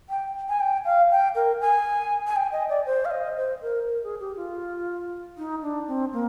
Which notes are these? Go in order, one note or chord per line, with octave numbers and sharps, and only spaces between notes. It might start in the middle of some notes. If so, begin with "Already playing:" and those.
G5
G#5
G5
F5
G5
A#4
G#5
G#5
G5
D#5
D5
C5
F5
D#5
C5
A#4
A#4
G#4
G4
F4
D#4
D4
C4
A#3